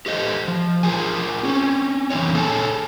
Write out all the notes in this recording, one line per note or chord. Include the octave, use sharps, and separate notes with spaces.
G4 A4 C5 D#5
F3
F4 G#4 A#4 G#5
C4 C#4
E3 A#3 C4 D#4 C#5
G#4 A4 C#5 G#5 A5